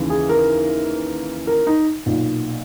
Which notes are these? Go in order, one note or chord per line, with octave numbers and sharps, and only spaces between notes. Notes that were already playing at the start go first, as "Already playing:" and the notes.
Already playing: D#2 C#3 E3
G#4
A#4
A#4
D#4
B1 A#2